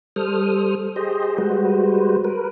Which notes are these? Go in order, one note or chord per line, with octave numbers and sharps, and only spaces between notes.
G3 A4 C5 D#6 F6
G4 G#4 C5 D#5
G3 G#3 F#4 B4 C5
A#4 B4